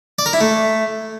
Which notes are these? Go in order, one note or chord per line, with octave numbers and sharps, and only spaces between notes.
D5
A#4
E4
A3